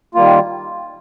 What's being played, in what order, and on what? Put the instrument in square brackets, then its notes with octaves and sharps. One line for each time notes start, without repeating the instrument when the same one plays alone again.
[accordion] D#3 G3 A#3 F4